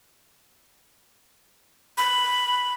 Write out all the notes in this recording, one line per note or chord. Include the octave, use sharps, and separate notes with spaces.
B5